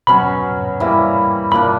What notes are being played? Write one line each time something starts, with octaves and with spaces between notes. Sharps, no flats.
B2 F#3 C#4 B5
E3 G3 A#3 E4
A#2 A#3 D4 B5